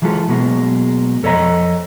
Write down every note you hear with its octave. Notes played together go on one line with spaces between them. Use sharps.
E3 F#3 G#3 F4 A4
B2 F#3 G#3 A#3
F2 A4 C#5 D#5 A#5